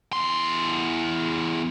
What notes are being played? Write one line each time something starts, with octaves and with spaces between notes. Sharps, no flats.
E2 C6